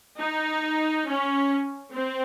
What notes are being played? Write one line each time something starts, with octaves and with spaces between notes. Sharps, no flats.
D#4
C#4
C4